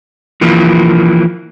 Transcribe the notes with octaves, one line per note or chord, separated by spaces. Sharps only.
E3 F3 A#3